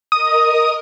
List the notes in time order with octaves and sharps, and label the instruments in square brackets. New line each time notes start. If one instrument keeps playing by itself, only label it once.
[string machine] A#4 D#5 [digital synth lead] D#6